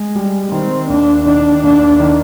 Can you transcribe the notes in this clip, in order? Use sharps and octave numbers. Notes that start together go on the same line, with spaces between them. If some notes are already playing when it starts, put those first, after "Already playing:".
Already playing: G#3
G3
D#3 C4
D#2 D4
D#3 D4
D#2 D4
D#3